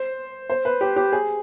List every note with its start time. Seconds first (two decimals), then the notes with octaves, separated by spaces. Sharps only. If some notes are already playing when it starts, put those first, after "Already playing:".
Already playing: C5
0.50 C5
0.65 B4
0.81 G4
0.96 G4
1.13 G#4